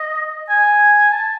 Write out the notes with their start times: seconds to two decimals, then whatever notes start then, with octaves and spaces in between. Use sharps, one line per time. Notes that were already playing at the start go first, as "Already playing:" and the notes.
Already playing: D#5
0.50 G#5
1.12 A5